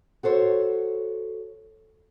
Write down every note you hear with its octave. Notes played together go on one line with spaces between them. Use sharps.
F#4 A4 C5 C#5